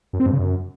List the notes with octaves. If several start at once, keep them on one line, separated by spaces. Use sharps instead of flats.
F#2
C4
G2
C#3
F#2